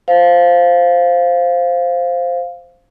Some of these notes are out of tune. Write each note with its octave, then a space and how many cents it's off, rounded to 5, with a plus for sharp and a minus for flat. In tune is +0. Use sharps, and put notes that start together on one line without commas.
C5 +0 F5 +0